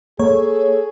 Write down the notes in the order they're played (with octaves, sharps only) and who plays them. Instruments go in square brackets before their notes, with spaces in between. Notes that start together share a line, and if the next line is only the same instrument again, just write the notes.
[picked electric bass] A#3 [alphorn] G#4 [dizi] A4 [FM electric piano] C#5